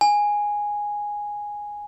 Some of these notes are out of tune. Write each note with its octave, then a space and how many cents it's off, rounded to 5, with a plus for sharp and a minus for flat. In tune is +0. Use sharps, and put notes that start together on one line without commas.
G#5 -5